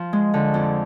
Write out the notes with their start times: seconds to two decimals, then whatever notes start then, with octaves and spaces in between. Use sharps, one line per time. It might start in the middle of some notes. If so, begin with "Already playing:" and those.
Already playing: F3
0.13 G#3
0.34 D3
0.54 F2